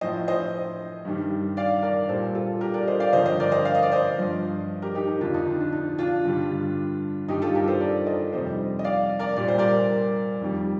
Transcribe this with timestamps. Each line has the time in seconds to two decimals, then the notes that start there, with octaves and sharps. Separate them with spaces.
0.01 A2 F3 C5 D#5
0.28 C5 D#5
1.05 G2 D#3 G3
1.57 D5 F5
1.83 A#4 D5
2.09 A#2 G3 A4 C5
2.35 F4 A4
2.61 G4 A#4
2.74 A#4 D5
2.87 C5 D#5
3.00 D5 F5
3.13 G2 D3 F3 C5 D#5
3.26 C5 D#5
3.40 A#4 D5
3.52 C5 D#5
3.65 F5
3.75 D#5
3.83 D5
3.92 C5 D#5
4.17 G2 F3
4.82 G4 A#4
4.95 D#4 G4
5.08 D#4
5.21 F2 D3 F3 D4 F4
5.34 D#4
5.47 D4
5.60 D4
5.73 D#4
5.98 D4 F4
6.25 G2 D3 G3
7.28 G2 D#3 G3 D#4 G4
7.42 F4 A4
7.55 G4 A#4
7.68 A4 C5
7.80 A#4 D5
8.07 C5 D#5
8.32 F2 C3 D#3 G3 C5 D#5
8.79 D#5
8.84 D5 F5
9.19 A#4 D5
9.36 A#2 G3 D5
9.48 C5
9.58 A#4 D5
10.41 F2 D#3 G3